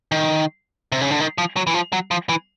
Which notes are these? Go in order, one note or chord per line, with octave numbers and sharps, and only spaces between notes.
D#3
C3
C#3
D3
D#3
F3
F#3
E3
F3
F#3
F3
E3